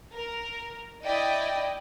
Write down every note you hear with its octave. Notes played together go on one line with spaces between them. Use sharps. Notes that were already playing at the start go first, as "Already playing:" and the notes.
A#4
E4 D5 D#5 G5